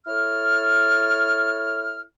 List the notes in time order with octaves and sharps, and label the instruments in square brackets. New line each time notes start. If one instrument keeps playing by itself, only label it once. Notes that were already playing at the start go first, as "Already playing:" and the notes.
[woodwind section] E4 A4 C#5 F6